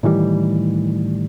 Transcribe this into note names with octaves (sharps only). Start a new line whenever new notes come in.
A2 D#3 E3 G3